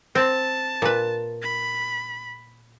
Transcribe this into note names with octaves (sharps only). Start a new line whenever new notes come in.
C4 A5
A#2 B4
B5